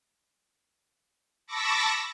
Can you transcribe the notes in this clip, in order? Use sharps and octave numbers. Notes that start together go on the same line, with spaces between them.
A5 B5 C#6 D6 E6 A#6